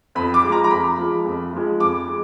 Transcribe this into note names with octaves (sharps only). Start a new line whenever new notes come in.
F2 B5
D6
F3 G#3
A#5
A#5
F2 B5
F3 G#3
F2
F3 G#3
F2 D6
G#3